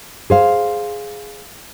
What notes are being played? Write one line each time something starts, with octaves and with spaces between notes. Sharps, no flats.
G#4 C5 F5